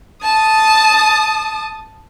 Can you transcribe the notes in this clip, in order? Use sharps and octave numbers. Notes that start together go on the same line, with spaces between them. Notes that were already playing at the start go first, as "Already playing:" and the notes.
A5 D#6